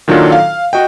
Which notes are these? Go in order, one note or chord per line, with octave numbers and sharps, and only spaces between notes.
A#2 D#3 F#3 D4 F4 A4
F5
F#4 D#5 G5